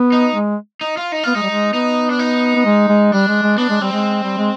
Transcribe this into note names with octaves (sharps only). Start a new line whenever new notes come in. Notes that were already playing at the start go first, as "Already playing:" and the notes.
Already playing: B3
D#4
G#3
D#4
F4
D#4
B3 F4
G#3 D#4
G3
G#3
B3 D#4
D4
D#4
B3
G#3
G#3
G3 D4
G#3
G#3
B3 D4
G#3
G3 C4
G#3
G3
G#3